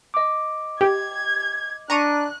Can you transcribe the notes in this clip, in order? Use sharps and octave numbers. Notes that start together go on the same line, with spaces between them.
D#5 D6
G4 G#6
D4 A#5 C#6 F#6 D#7